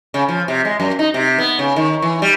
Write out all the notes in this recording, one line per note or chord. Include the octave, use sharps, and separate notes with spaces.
C#3
F3
C3
G#3
F#2
D#4
C3
B3
C#3
D#3
E3
G3